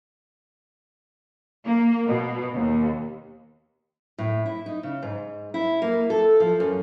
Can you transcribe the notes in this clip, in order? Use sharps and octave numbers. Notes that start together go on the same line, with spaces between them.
A#3
B2
D#2
A2
E4
D#4
C#3
G#2
E4
A#3
A4
F3
F#2